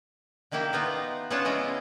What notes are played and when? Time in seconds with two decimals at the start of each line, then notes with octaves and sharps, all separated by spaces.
0.51 D3 D#3 A#3 E4 G4
0.73 B3 D#4 F4
1.30 B3 C#4 D4 F4 C#5 A5
1.45 C#3 G#3 C#4 E4 D#5